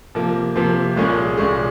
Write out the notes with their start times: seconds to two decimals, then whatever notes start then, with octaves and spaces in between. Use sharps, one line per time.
0.15 C3 F3 A#3
0.56 C3 F3 A#3
0.96 C2 A#2 G#3 C#4 G#4
1.37 C2 A#2 G#3 C#4 G#4